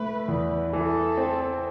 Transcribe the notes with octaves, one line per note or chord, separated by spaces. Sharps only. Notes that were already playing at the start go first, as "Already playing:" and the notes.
Already playing: A3 E4 B4
E2
E3 A4
C4